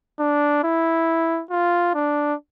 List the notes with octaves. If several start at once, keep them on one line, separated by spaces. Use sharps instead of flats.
D4
E4
F4
D4